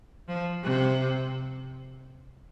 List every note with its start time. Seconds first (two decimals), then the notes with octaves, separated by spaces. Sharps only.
0.28 F3
0.64 C3